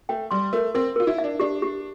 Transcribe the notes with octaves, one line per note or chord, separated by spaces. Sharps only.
A3 G5
G3 C6
A3 A#4
C4 A#4
F4 A#4
E4
E5
D4
D4 G4
G4